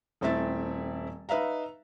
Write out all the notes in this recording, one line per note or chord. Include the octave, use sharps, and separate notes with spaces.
D#1 A3 C4 E4 E5 A6
D#4 B4 E5 F5 A#5